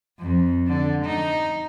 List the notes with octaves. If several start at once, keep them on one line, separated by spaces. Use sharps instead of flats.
F2
D3
D#4